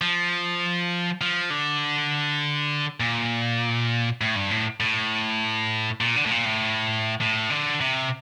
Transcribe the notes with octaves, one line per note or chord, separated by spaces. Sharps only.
F3
F3
D3
A#2
A2
G2
A2
A2
A#2
D3
A2
A#2
A2
A2
D3
C3